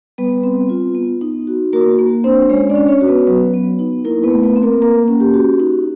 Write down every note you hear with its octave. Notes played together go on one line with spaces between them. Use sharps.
G3 B3 B4
C4
F4
B3
D#4
F#4
A#3 F#4 A#4
A#3
C4 D4 C5
G#3 C#4 C#5
D4 D5
C#4
C#4 C#5
F#4
B3 B4
F#3 B3 B4
B3
D#4
A#3 E4 A#4
B3 B4
A3
B3 B4
C4
A#3 A#4
A#3 A#4
C#4
G4
F#4
D#4